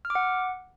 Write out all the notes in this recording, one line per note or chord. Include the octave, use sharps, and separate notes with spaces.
F6
D6
F#5